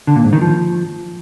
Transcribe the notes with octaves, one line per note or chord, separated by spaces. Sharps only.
D3
A#2
G#2
D#3
F3